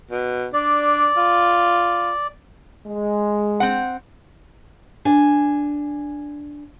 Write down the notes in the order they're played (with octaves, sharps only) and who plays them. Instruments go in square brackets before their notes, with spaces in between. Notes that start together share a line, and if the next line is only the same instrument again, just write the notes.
[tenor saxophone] B2
[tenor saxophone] D4 [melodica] D5
[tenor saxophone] F4
[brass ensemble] G#3
[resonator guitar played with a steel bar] C4 F#5
[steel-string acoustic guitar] D4 G#5